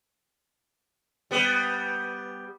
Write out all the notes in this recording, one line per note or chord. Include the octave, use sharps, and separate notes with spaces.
G3 B3